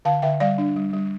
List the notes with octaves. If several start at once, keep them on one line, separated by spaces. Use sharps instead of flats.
D3 F5 A5
D3 E5 G5
G3 D5 F5
D4
G3
G3